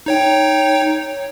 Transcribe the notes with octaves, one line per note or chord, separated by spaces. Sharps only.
D#4 C#5 G5